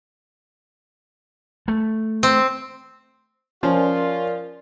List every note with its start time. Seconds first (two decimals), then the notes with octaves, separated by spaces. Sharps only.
1.68 A3
2.23 C4
3.63 F3 C#4 F4 A#4 D5 C6